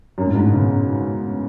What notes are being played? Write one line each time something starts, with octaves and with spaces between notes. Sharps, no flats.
F#2
A2
G#2
B2
C#3